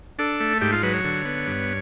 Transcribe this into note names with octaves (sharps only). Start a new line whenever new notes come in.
D4 A4
A3
G#2 G4
F4
F#3 B4
C#5
D3
B3
G2